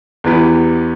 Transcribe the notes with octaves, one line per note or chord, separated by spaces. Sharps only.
E2 E3 B3 G4 B4